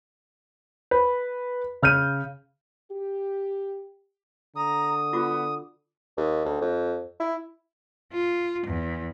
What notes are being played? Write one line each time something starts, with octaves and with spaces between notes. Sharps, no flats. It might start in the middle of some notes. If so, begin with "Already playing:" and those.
B4
C#3 F6 G6 D#7
G4
D3 A#5 D#6
B3 F4 F#4 D6
D#2
D2
F2
E4
F4
E2